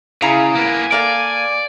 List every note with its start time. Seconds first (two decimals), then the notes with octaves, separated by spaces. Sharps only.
0.22 C#3 E4 G#4 F5 A#5
0.55 A#3 B3 G#5
0.92 A#3 A4 D5 F5